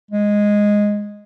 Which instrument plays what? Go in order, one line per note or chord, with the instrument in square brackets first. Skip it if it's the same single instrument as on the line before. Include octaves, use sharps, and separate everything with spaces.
[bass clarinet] G#3